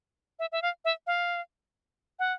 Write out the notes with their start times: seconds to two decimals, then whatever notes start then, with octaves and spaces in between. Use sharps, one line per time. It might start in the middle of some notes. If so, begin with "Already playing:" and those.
0.39 E5
0.52 E5
0.62 F5
0.85 E5
1.07 F5
2.19 F#5